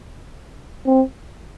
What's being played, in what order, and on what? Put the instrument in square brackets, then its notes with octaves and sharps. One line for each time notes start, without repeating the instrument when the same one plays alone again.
[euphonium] C4